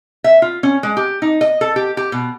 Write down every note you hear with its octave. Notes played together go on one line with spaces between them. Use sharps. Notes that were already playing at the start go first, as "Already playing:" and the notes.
E5
F4
C#4
G#3
G4
D#4
D#5
A4
G4
G4
B2